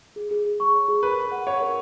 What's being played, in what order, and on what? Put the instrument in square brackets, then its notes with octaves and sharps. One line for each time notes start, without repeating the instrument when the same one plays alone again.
[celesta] G#4
G#4
G#4
C#6
C#5
G#4
[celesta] A#4 [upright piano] B4
[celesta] A#4
F#5
[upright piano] C#5 [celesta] F#5
[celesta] A#4